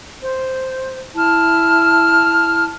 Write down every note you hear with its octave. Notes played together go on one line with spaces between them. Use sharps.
C5
E4 A5 F6